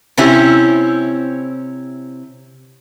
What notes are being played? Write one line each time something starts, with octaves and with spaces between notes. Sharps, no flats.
C3 C4 C#4 E4 G4